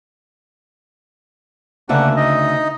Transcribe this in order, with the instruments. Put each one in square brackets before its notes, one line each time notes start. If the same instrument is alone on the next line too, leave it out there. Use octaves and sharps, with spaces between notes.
[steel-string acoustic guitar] D2 C#3 E5 [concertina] A#3 D4 F#5
[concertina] D#4 D#5